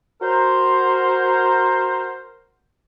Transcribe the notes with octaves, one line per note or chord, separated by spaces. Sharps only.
F#4 A#4 C5